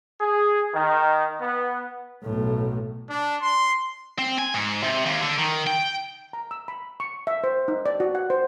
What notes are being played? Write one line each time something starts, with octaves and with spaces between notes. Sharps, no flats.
G#4
D#3
B3
B1 A2
D4
C6
C4
G#5
G#2
C3
D#2
D3
D#3
G5
A#5
E6
B5
C#6
E5
C5
D#4
D5
F#4
F#5
C5